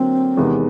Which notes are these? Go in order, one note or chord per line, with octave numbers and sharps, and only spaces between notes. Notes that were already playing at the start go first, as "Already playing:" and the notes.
Already playing: D3 F#3 A#3 C4
E2 C3 D#3 G#3 B3